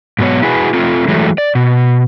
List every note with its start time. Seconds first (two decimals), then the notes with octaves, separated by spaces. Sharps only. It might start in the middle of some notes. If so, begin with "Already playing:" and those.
0.19 G#2 B2 F#3 B3 C#5
0.42 E4 F#4 G#4 B4
0.74 A3 C4 F4
1.08 E3 F#3 G#3 A3
1.38 D5
1.55 B2